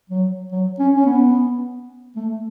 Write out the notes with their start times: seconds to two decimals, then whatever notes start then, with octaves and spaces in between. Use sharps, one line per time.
0.09 F#3
0.51 F#3
0.79 C#4
0.96 C#4
1.06 B3
2.16 A3